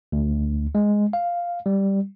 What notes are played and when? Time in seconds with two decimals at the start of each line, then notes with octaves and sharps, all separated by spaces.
0.12 D2
0.75 G#3
1.13 F5
1.66 G3